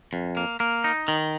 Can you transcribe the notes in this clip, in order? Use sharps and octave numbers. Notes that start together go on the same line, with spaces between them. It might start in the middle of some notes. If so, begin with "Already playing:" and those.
F2
A#3
A#3
D#4
D#3